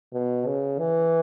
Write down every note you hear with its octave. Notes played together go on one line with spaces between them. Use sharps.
B2
C#3
E3